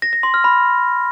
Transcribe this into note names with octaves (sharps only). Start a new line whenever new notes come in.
A#6
A#6
C6
F6
B5